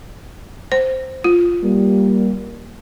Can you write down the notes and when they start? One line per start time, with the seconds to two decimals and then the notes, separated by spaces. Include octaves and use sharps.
0.72 C5
1.24 F4
1.64 G3 A#3